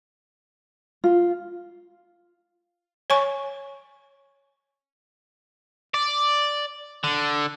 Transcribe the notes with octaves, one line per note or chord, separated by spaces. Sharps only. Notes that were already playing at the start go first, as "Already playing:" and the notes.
F4
C#5 G#5 C#6
D5
D3